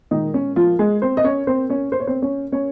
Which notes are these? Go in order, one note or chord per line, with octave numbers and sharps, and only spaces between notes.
A#2 D#3 G#3 D#4
C#4
F3 F4
G#3 G#4
C4 C5
D#5
C#4 C#5
C4 C5
C#4 C#5
C5
C#5
C4 C5
C#4 C#5
C#4 C#5